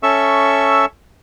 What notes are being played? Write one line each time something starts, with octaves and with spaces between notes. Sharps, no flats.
C#4 A4 E5 C#6 E6